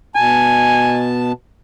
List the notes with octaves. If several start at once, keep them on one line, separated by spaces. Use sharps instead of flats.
B2 G#5 A5